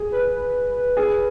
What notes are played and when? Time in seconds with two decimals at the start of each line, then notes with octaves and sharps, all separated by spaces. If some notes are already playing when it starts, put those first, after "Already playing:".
Already playing: G#4
0.12 B4
0.97 G#4